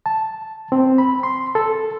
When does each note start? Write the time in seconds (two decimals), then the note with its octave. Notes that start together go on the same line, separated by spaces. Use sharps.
0.06 A5
0.72 C4
0.98 B5
1.23 C6
1.55 A4